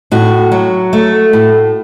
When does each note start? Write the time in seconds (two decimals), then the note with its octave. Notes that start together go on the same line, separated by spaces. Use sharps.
0.11 A2 F#4
0.52 F#3
0.93 A3
1.33 A2